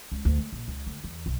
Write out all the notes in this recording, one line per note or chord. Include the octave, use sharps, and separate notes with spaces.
C#2
D2
A3
A#1
C#2
D2
E2
B1